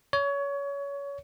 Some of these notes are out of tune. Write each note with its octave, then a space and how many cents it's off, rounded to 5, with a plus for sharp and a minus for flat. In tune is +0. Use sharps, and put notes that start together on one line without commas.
C#5 +25